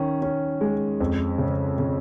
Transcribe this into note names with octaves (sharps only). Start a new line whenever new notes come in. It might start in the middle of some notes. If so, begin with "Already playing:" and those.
Already playing: D#3 C#4
C#4
G#3
F2
C#3
C#3